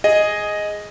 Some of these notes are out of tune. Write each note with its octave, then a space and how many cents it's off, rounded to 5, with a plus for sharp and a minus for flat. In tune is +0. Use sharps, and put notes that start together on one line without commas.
G#4 +0 D#5 +0